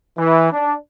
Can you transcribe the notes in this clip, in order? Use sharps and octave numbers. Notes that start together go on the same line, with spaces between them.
E3
D4